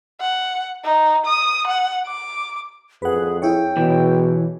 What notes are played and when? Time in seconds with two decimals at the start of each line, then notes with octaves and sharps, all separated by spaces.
0.20 F#5
0.84 D#4
1.26 D#6
1.67 F#5
2.06 D6
3.02 F2 G#4 B4 F#5
3.42 E4 G#4 C#5 G5
3.77 B2 E3